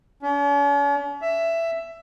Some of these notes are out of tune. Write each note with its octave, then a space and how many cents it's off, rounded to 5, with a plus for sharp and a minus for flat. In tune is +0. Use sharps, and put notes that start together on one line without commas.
C#4 +45
E5 +10